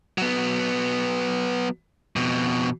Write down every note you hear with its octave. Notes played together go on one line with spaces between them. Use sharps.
F#3 B3
F2 B2